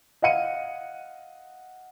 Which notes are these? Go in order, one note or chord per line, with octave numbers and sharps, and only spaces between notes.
D#5 F5 F#5 C#7 D#7